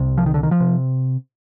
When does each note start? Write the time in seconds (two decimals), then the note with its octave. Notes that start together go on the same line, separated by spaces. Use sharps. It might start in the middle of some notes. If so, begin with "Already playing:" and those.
Already playing: C2 C3
0.18 F3
0.26 D#3
0.34 D3
0.43 D#3
0.51 F3
0.60 C3